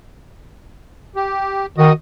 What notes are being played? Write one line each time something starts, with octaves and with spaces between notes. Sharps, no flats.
G4
D#3 F#4 D#5 D#6